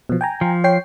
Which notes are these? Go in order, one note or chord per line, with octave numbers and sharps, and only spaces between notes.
B2 F3
G5 G#5 A#5
F3
C#5 G5 C7